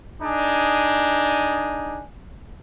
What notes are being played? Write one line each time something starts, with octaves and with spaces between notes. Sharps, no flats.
D4 D#4 G#4